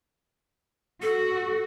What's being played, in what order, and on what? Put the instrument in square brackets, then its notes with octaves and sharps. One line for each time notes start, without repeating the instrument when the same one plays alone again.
[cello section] F#4 [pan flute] A4